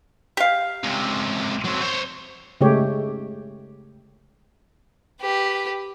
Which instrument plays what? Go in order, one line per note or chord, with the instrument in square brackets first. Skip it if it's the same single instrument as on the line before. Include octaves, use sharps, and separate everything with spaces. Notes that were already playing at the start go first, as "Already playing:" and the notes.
[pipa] G4 F5
[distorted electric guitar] C#2 C3
F#3 C4
C5 C#5
[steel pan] C#3 G#3 A3 G4 C#5
[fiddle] G4 B4